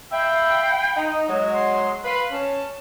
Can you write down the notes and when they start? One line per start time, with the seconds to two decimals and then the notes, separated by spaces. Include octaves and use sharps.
0.11 E5 F5 G5 B5
0.96 D#4
1.29 F#3 G#3
1.52 C6
2.04 B4 F5 C6
2.31 C#4 A5